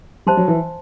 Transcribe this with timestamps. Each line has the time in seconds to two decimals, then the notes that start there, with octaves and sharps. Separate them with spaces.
0.26 G3 C5 E5 A5 C6
0.37 F#3
0.48 E3